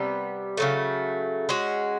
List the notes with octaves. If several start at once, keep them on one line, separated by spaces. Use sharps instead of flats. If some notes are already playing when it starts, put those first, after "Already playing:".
Already playing: C3 G3 B3
C#3 F#3 A3
G#3 C#4 F#4